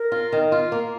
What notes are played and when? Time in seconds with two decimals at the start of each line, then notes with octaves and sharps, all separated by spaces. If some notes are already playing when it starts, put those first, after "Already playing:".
Already playing: A#4
0.12 F4
0.32 D#3
0.52 F4
0.72 A#3